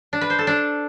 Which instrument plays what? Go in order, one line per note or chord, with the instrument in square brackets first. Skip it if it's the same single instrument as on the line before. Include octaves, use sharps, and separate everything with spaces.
[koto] D4
B4
C5
A4
D4